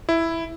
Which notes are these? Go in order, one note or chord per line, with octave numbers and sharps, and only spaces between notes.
E4